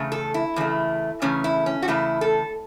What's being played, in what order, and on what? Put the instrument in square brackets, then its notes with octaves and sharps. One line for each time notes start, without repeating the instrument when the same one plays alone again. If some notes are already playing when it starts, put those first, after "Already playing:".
Already playing: [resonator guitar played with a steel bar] E2 C#3 A3
A4
E4
E2 C#3 A3
E2 C#3 A3 C#4
E4
C#4
F#4
E2 C#3 A3 E4
A4